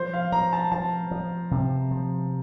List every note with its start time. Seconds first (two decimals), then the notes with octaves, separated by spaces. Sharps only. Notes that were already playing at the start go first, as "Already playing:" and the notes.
Already playing: F3 C5
0.14 F5
0.32 F3 A#5
0.53 A5
0.72 F3 A5
1.11 F3
1.51 C3
1.91 F3